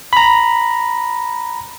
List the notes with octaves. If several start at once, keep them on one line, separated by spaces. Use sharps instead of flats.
A#5 B5